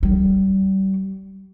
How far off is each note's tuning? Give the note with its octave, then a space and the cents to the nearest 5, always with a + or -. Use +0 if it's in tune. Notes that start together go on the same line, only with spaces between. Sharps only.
G3 -30